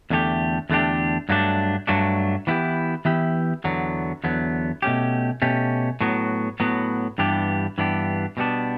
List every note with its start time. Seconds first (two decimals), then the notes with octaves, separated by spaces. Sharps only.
0.10 E2 D3 A3 D4 G4
0.70 E2 D3 A3 D4 G4
1.29 G2 F#3 A3 D4
1.87 G2 F#3 A3 D4
2.47 E3 B3 E4 G4
3.05 E3 B3 E4 G4
3.64 E2 D3 F#3 B3
4.24 E2 D3 F#3 B3
4.82 B2 A3 C#4 G4
5.42 B2 A3 C#4 G4
6.01 A2 F#3 B3 F#4
6.60 A2 F#3 B3 F#4
7.18 G2 E3 B3 D4 G4
7.78 G2 E3 B3 D4 G4
8.37 B2 G3 B3 D4